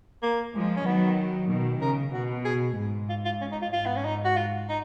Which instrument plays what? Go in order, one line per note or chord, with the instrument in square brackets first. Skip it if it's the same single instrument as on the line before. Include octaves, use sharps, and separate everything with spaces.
[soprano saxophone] A#3
[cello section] F3 G#3
[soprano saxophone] C#4
[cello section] D#3 F#3 [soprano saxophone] B3
[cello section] B2 D#3
[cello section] C#3 [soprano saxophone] A#4
[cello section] B2 [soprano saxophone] F#4
[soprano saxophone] G#4
[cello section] G#2
[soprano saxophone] F4
F4
C#4
D#4
F4
[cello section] G#2 [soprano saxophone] F4
[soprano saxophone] B3
C#4
D#4
F#4
F4
D#4